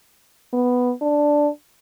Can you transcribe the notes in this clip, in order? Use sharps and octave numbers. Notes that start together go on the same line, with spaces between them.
B3
D4